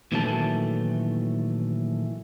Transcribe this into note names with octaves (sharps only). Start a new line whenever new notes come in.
A#2 D#3 E3 F#3 A3 A5